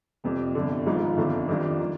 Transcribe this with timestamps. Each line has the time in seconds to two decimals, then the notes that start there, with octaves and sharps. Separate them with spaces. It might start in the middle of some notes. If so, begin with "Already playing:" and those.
0.24 F2 C3 G3
0.55 G1 F2 D3
0.86 G#1 G#2 F3 G#3 D#4
1.17 G1 F2 D3
1.48 F2 D#3 G3 D4 F4
1.81 D#3